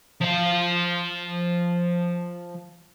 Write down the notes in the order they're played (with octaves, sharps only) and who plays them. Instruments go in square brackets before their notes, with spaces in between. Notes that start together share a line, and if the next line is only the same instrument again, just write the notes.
[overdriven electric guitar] F3 F5